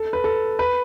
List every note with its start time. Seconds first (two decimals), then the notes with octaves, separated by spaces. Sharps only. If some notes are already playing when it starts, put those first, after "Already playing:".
Already playing: A4
0.13 B4
0.24 A4
0.59 B4